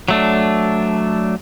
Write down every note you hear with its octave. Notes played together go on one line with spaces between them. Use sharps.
F#3 A3 D4